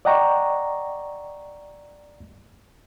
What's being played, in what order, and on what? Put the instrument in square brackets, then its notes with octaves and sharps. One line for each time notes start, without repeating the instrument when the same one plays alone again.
[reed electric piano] D5 D#5 F#5 G5 A#5 C#6